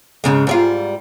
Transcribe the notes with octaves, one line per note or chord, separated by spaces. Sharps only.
G#2 C#3 G#3
G#2 G3 F4